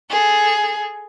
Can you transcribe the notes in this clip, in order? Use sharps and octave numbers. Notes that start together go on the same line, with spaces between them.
G#4 A4